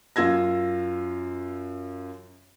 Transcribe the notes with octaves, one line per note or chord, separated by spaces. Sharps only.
F#2 F4 E6 G#6 A#6